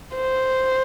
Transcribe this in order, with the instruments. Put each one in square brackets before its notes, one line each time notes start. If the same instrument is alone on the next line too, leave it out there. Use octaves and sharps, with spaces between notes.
[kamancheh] C5